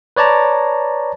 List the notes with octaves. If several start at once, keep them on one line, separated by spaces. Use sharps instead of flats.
B4 C#5 D5 A5 A#5